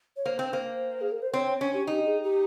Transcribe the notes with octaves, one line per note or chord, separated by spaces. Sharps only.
C#5
A#3 C5
C4
A#3 C5
G#4
A#4
C5
C4 C#5
C#5
C#4 C#5
G4
D#4 G4
G#4
G4